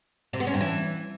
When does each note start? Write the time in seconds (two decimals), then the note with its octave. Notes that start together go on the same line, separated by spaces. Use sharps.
0.33 C3
0.40 B3
0.47 C#4
0.54 G2
0.61 E3